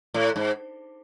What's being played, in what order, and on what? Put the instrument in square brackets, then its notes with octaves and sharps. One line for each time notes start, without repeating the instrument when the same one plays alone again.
[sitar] A2
G#2